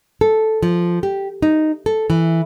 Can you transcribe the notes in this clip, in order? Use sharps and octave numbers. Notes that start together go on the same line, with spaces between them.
A4
F3
G4
D#4
A4
E3